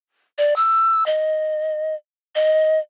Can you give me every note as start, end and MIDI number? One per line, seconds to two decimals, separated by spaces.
0.38 0.54 74
0.56 1.04 88
1.06 1.95 75
2.35 2.79 75